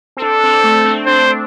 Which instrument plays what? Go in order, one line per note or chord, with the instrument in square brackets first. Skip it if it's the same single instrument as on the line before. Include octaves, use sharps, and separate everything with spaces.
[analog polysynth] C4
[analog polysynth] D4 [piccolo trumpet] A4
[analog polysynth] C4
A3
C4
[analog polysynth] D4 [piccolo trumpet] C5